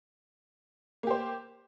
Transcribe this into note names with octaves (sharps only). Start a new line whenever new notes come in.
A#3 G4 C5